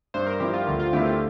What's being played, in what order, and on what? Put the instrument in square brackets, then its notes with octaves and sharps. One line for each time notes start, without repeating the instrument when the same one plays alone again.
[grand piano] G2 [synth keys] C5
[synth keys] A#4
[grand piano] F3 C4 E4 [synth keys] G4
[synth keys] F4
[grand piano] D2 [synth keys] F4
[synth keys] F4
[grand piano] D3 A3 C4 E4 [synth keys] G4
[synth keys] F4